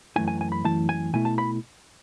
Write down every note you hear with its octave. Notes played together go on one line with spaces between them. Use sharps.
F#2 E3 A3 E4 G#5
G#5
G#5
B5
F#2 E3 A3 E4 A5
G#5
B2 A3 E4 G#5
A5
B5